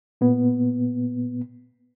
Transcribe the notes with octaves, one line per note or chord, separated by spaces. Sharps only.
A#2 B3